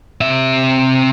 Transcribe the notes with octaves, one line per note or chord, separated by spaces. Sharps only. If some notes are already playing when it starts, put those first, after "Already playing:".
C3 E5